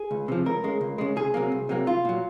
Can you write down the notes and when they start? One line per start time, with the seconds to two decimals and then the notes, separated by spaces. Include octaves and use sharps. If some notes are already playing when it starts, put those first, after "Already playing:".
Already playing: G#4
0.11 C#2
0.28 C3 F3
0.46 C#2 A#4
0.64 C#3 G#3
0.81 C#2
0.98 C#3 G#3
1.16 C2 G#4
1.34 C3 F#3 A#3
1.52 C2
1.69 C3 F#3 A#3
1.86 C2 F4
2.05 A#2 F#3